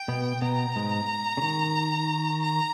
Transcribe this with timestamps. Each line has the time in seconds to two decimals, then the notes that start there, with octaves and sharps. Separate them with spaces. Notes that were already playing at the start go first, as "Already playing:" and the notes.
Already playing: G5
0.08 B2 B3
0.42 B2 B3 A#5
0.76 G#2 G#3
1.37 C#3
1.42 D#3
2.43 A#5